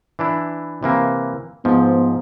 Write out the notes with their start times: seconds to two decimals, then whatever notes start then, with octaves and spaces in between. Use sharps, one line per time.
0.19 E3 D4 E4
0.83 C3 E3 A#3
1.65 G#2 F3 B3